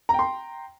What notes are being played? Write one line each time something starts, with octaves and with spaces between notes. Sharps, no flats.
G5 A#5 C6